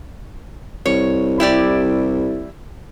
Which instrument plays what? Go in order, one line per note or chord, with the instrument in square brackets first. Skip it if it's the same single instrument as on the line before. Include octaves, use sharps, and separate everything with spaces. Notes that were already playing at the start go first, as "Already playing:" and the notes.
[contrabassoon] C2 [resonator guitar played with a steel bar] C#5
[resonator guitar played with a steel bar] E4 G4 D5